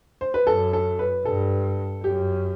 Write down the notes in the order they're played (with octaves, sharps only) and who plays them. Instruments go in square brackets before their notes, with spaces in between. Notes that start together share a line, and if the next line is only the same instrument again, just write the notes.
[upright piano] C5
B4
[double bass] F#2 [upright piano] A4
[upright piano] A4
B4
[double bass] G2 [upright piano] A4
[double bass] F#2 [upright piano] G4